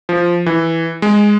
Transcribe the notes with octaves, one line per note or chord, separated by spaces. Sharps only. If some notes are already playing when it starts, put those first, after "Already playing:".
F3
E3
G#3